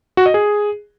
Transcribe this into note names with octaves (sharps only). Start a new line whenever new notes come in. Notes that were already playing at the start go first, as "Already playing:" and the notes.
F#4
D#5
G#4